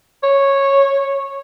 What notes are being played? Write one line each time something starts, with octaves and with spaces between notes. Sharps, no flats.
C#5